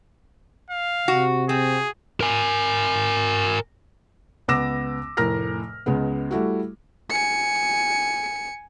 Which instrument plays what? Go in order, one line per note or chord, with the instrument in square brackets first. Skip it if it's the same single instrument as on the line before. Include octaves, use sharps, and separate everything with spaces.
[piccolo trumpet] F5
[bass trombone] C3 [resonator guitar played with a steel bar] F#4
[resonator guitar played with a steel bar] C4 [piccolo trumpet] G#4
[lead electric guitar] A#4 G#5
[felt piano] C#2 B3 D6 E6 A#6 E7
F1 A2 A#4 A#5 F6 A#6
C#2 C#3 G#3 B3
G3 A3 E4 F#4
[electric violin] G#5 C#7